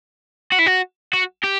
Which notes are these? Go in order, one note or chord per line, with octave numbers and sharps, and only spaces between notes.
F#4
E4
F#4
F#4
G4